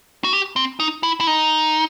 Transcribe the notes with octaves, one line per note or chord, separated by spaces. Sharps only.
F#4
G4
C4
D#4
E4
E4
D#4